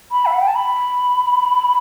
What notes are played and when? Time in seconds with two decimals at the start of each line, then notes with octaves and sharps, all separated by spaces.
0.11 B5
0.26 E5
0.33 F#5
0.41 G5
0.47 A5
0.55 B5